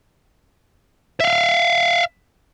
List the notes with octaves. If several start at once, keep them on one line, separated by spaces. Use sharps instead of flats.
E5 F5